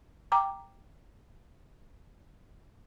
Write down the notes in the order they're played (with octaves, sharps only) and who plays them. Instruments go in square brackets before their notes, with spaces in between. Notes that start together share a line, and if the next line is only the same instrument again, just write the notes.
[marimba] G5 A#5 D6